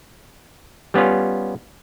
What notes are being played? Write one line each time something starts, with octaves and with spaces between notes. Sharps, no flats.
G3 B3 C#4 F4